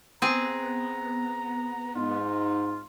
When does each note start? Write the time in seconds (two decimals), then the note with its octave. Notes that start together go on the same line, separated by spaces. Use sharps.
0.22 B3 C4 G#4 A#5
1.96 G#2 D#4 F4